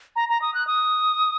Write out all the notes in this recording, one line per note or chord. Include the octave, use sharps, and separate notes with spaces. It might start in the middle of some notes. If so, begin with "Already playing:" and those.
A#5
A#5
D#6
F#6
D#6